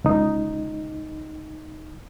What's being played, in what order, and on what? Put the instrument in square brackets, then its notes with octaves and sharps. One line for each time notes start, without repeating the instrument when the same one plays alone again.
[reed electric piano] C#2 D#4